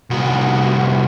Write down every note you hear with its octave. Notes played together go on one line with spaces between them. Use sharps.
C2 F#4